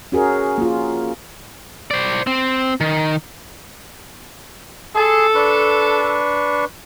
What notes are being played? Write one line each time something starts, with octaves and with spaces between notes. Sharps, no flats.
C#4 F#4 G#4 A#4
A#3 F4
C5 D5
C4
D#3
G#4 A4 C6
D4 B4 C#6